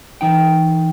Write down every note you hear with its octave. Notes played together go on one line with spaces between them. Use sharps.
E3 D#4 G5